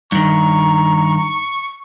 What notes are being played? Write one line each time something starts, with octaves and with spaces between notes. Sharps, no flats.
G2 D#3 A#5 C#6